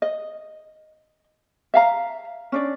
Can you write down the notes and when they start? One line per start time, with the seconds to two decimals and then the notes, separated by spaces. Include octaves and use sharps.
0.02 D#5
1.74 E5 F5 A#5
2.52 C#4 D4 D5